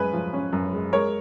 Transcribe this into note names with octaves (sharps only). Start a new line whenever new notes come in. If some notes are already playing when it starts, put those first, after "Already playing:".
Already playing: F#2 G#3 C#4 B4 G#5
F3
C#4
F#2
G#3
G#3 A#4 C#5